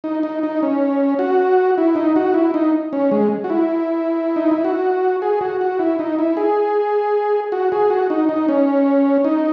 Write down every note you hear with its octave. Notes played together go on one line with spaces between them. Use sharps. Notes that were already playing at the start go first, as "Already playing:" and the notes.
D#4
D#4
D#4
C#4
F#4
E4
D#4
F#4
E4
D#4
C#4
G#3
F#4
E4
D#4
E4
F#4
G#4
F#4
F#4
E4
D#4
E4
G#4
F#4
G#4
F#4
D#4
D#4
C#4
D#4